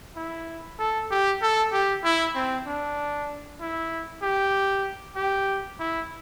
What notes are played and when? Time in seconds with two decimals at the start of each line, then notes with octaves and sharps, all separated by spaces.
0.16 E4
0.79 A4
1.11 G4
1.42 A4
1.73 G4
2.04 E4
2.35 C4
2.67 D4
3.60 E4
4.22 G4
5.16 G4
5.79 E4